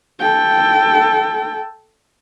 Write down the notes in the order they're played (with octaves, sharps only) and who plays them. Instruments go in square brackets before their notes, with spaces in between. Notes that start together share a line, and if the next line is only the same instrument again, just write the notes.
[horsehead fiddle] A4 G5